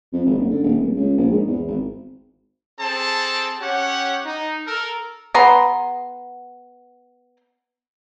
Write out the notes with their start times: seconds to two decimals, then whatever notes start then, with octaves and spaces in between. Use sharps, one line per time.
0.13 F2
0.26 G#1
0.38 F#1
0.51 D3
0.63 D#1
0.80 D1
0.96 C#2
1.18 A#1
1.32 G#2
1.47 E2
1.67 G#1
2.80 C4 G#4 A4 A5
3.60 C#4 G4 C#5 F#5
4.25 D#4
4.67 A4 A#4
5.34 B3 G#4 A#5 C6